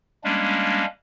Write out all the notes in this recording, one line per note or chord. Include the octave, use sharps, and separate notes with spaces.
G3 G#3 A#3 C#4 D4